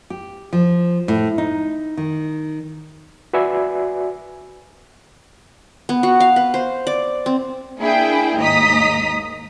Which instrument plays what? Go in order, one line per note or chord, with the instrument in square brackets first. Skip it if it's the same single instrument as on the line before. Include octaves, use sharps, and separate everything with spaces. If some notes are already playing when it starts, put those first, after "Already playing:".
[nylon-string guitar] G4
F3
A2
D#4
D#3
[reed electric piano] F#4 B4 D5 E5 G#5
[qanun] B3
F#4
F5
B4
C5
D5
C4
[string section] A#3 D4 E4 G#4 G5
D#2 G#2 D#5 A#5 D#6 B6